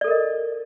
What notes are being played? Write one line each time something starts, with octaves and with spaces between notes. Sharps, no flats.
A4 A#4 D5 D#5